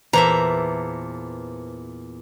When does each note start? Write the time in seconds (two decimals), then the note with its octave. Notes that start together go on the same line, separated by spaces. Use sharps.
0.13 E2 A#2 B4 C5 E5 A5 A#5